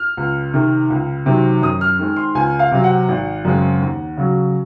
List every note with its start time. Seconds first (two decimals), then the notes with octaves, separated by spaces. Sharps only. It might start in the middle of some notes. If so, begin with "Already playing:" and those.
Already playing: F6
0.17 C#2
0.54 C3 D#3
0.90 C#2
1.26 C3 D#3 F#3 C4
1.62 F#2 D#6
1.81 F6
1.99 D#3 G#3 C4
2.16 C6
2.35 C#2 G#5
2.59 F5
2.72 C3 F#3 C4
2.84 F#5
3.08 G#1
3.45 F#2 C#3 G#3 C4
3.81 D#2
4.17 C#3 F#3